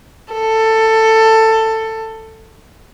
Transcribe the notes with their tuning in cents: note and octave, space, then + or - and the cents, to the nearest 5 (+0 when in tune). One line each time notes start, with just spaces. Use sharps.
A4 +15